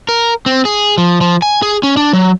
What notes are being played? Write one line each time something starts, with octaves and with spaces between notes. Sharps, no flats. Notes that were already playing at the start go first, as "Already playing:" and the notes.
A#4
C4
G#4
F3
F3
G#5
G#4
C#4
D4
F#3